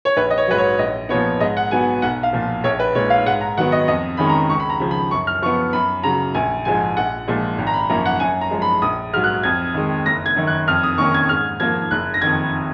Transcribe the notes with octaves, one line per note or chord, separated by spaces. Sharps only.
C#5
A#1 B4
D#5
C#5
G#2 F#3 B4
C#5
A#1 D#5
A#2 F3 B3 C#5
G#2 D#5
F#5
F#3 B3 G#5
B1 F#5
F5
A#2 F3
A#1 C#5
B4
A#2 G#3 C#5
F5
G#2 F#5
A#5
D#3 F#3 B3 F#5
D#5
F2 D#5
D#3 G#3 C#4 B5
A#5
C#2 C#6
B5
A#5
C#3 F3
B5
F#2 C#6
F6
F3 B3 C#6
F#2 B5
C#3 F#3 A#5
A#1 G#5
G#2 F3 G#3 G#5
A#1 F#5
A#2 F3 G#3
G#1
A#5
B5
F#2 F3 A#3 C#4 A#5
F#5
F#2 G#5
A#5
F3 G#3
B5
A#1 D#6
G#2 F#3 F6
F#6
F2 G#6
D#3 G#3
F#1 A#6
G#6
F#2 D#3
F#6
F2 F6
D#6
D#3 A#3 C#4 C#6
G#6
G#2 F6
F3 A#3 G#6
F#1 F#6
A#6
F2 D#3 G#6